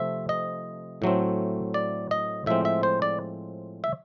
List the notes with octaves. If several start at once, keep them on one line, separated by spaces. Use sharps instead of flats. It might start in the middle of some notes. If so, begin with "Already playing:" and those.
Already playing: C3 F3 A3 C4 E5
D#5
A2 F#3 A3 C4
D5
D#5
A2 F3 G#3 C4 E5
E5
C5
D5
E5